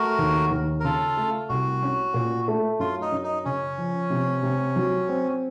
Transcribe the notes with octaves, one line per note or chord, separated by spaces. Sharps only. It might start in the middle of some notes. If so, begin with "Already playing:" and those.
Already playing: A3 F#4 A#4
D#2
D#2
A#4
C#3 F4 A4
A3
C2 F#4
C#4
A#2
A3
F#2 F4
D#4
F#2
D#4
C#3 C#4
F3
C3
C3
F#3
C4